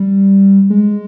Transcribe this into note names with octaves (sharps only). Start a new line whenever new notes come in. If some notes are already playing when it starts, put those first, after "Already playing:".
Already playing: G3
G#3